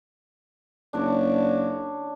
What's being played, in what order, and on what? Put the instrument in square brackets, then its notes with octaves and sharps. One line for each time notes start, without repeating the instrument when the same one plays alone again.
[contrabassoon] F#1 [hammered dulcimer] D4 C#5 D5